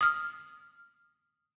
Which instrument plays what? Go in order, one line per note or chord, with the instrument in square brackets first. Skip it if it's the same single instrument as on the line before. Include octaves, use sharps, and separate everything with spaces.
[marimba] D#6 F6